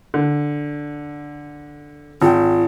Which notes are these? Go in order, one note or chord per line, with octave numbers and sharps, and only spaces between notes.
D3
G#1 F4 G5